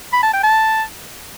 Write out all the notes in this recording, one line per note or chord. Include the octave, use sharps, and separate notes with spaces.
B5
A5
G5
A5